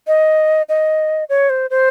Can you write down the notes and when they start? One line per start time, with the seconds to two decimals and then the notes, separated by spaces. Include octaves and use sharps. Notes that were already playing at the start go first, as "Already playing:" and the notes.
0.07 D#5
0.69 D#5
1.29 C#5
1.50 C5
1.70 C5